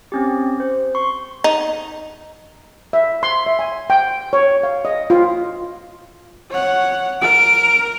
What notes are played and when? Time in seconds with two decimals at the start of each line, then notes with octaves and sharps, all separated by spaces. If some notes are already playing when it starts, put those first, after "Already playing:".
0.12 C4 C#4 G4
0.60 C5
0.95 C6 C#6
1.44 D#4
2.93 E5
3.23 C6
3.46 E5
3.59 G#5
3.90 G5
4.33 C#5
4.63 F5
4.85 D#5
5.10 F4
6.50 C#5 F#5
7.21 A#4 D7